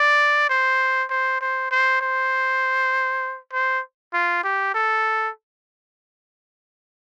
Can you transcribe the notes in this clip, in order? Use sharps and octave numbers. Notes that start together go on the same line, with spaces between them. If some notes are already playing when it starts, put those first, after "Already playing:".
Already playing: D5
C5
C5
C5
C5
C5
C5
F4
G4
A4